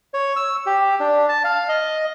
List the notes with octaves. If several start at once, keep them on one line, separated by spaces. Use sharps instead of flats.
C#5
E6
G4
D4
A5
F5
D#5